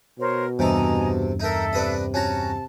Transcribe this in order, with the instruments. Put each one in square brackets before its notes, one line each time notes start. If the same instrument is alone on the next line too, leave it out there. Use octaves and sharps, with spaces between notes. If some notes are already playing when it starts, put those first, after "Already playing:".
[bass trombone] B2 [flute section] A#4 C5 C#5
[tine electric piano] E2 G2 [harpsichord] C3 A4 [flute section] D#5 G#5 A#5
[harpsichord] D#4 A#4 [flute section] A4 E5
[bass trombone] C3 [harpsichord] D4 B4 D#5
[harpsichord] C#4 F#4 A#5 [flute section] A5